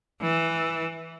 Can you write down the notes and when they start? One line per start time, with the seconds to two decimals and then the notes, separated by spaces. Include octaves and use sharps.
0.22 E3